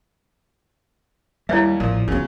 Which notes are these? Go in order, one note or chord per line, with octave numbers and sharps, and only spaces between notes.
D#2 G3 E4 C#5 E5
A1 A#2 F3
C#3 E3 F#3 B3